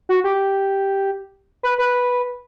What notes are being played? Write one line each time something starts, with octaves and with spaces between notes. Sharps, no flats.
F#4
G4
B4
B4